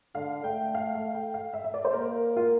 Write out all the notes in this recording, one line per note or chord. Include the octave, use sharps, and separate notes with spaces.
D3 F5
A3 G5
F5
F5
G5
F5
E5
E5
D5
C5
A#3 A#4
F4